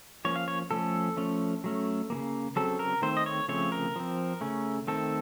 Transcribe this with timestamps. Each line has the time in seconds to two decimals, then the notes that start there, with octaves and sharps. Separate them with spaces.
0.25 F3 A#3 C#4 C#5
0.36 F5
0.48 C#5
0.71 F3 A3 C#4 A4
1.17 F3 A3 C#4
1.64 F#3 A3 C#4
2.10 C#3 F3 A#3
2.56 C#3 F#3 C4 A4
2.79 A#4
3.02 D#3 A3 C4 C5
3.17 D#5
3.26 C#5
3.48 C#3 F3 A3 C4 C#5
3.72 A#4
3.96 F3 C4
4.41 C#3 A3 C#4
4.87 D#3 A3 C4 A4